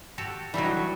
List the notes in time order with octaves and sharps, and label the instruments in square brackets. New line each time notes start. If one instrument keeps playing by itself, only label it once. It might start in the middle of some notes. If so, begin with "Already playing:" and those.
[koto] F#4 G4 A4
[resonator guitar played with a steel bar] E3 F#3 [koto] G3 A3 D#4